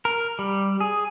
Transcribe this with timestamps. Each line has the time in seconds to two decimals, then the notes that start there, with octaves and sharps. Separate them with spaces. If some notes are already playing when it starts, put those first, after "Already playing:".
0.05 A#4
0.39 G3
0.80 G#4